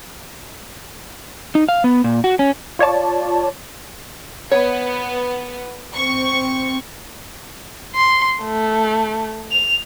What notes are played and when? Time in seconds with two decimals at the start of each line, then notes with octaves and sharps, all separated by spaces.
1.55 D#4
1.69 F5
1.84 B3
2.04 A#2
2.24 F#4
2.39 C#4
2.79 F4 C#5 D5 A5
4.51 B3 C#5
5.94 C4 C#6
7.95 C6
8.43 A3
9.51 F7